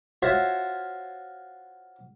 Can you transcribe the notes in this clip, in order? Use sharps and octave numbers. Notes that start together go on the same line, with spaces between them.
F4 F#4 C5 C#5 E5